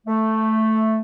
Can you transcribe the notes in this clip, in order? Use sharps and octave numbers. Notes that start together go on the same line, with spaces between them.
A3